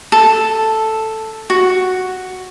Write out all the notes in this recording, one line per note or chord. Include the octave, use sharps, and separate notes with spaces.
A4
F#4